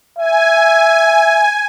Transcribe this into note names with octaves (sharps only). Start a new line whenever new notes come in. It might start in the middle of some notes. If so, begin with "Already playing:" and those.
E5 G#5